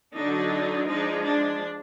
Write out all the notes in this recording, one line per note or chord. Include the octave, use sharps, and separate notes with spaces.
D3 F#3 D4 D#4
F3 G#3 D4 D#4
D4